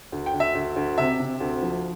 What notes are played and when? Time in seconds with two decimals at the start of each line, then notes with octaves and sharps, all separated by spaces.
0.12 D2
0.26 G5
0.34 D2
0.40 E5
0.55 D2
0.76 D2
0.98 C3 E5
1.20 C3
1.41 D2
1.63 F3